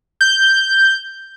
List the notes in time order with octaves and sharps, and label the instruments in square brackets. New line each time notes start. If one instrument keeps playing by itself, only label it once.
[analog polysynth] G6